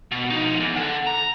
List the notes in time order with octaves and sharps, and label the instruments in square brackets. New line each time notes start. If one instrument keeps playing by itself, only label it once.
[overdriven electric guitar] B2
F3 D#4
E2
A4 F#5
A#5